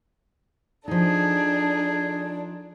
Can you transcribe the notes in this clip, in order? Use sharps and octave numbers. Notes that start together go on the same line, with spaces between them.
F3 D4 D#4 G#4 A4